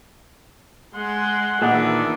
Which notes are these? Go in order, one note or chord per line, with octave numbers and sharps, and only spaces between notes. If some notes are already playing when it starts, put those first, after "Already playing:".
G#3 F#5 C6
A#2 D#3 E3 D4 G#4 D#5 F#5